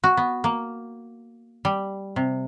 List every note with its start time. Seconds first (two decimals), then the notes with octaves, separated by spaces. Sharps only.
0.04 F#4
0.17 B3
0.44 A#3
1.65 G3
2.16 C3